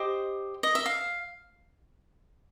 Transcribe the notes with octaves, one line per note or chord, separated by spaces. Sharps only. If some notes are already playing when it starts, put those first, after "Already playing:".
Already playing: G4 C5 D#5
D#5
E5
F5